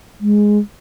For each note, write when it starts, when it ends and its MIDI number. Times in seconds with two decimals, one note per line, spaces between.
0.21 0.59 56